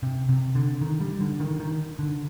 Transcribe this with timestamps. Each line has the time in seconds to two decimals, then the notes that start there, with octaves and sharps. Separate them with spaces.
0.03 C3
0.29 C3
0.55 D3
0.81 D#3
1.01 G3
1.21 D3
1.40 D#3
1.60 D#3
1.99 D3